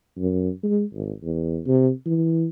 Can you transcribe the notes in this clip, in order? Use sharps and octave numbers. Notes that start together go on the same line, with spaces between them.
F#2
G#3
G#1
E2
C3
E3